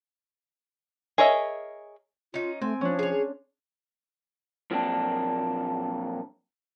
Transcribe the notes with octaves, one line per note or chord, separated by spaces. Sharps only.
G#4 A#4 C#5 D#5 E5
C#4 D#4 F4
A3 C4 G#5
F3 C#4 D4
G#4 C#5
A#2 F3 F#3 A#3 C4 D4